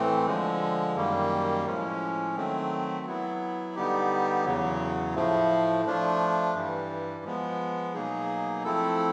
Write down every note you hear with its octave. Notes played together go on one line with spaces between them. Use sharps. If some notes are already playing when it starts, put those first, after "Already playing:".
Already playing: A2 E3 A3 C4
D3 F3 G#3
F#2 D#3 G3 A#3
A2 F3 G#3 C#4
D#3 F#3 A3 C4
F#3 B3 E4
D3 G3 B3 D#4 G4
E2 C#3 F#3
A2 F3 A3
F3 A3 D4 F4
G2 E3 G3
F3 G#3 B3
B2 F#3 A#3 D#4 G#4
F3 A3 C4 E4 A4